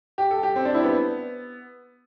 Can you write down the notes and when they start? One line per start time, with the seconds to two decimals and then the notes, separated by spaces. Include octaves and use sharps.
0.18 G4
0.31 A4
0.43 G4
0.56 C4
0.65 D4
0.74 E4
0.84 B3